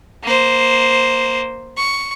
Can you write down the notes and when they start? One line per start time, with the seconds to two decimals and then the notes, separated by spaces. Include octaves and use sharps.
0.23 A#3 C5
1.77 C#6